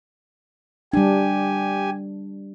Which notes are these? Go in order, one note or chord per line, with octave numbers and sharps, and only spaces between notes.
G3 D4 G4 G#5